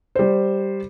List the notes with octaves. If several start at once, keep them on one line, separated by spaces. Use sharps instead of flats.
G3 C5